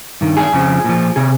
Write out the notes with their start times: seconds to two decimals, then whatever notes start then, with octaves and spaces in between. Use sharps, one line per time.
0.21 G2 D#3
0.37 G#4
0.52 F2 C#3 F3
0.84 A#2 F3
1.16 C3 G#4